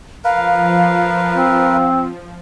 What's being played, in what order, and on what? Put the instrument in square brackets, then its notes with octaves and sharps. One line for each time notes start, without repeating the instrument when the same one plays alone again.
[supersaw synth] F3 [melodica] A#4 B4 [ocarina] F5
[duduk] C4